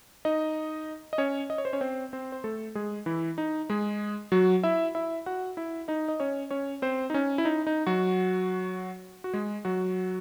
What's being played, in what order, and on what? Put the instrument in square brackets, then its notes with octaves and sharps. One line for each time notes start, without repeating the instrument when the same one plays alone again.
[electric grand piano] D#4 D#5
D#5
C#4 C#5
D#5
C#5
C5
C#4 C#5
C4 C5
C4 C5
C5
A3 A4
G#3 G#4
E3 E4
D#4
G#3 G#4
F#3 F#4
E4 E5
E4 E5
F#4 F#5
E4 E5
D#4 D#5
D#5
C#4 C#5
C#4 C#5
C4 C5
D#4
C#4
E4
D#4
D#4
F#3 F#4
F#4
G#3 G#4
F#3 F#4